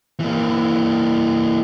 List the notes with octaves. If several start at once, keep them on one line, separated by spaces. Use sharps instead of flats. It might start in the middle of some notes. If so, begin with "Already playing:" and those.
E3 A#3